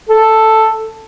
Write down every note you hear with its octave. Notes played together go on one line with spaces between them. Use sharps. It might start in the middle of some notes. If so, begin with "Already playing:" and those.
A4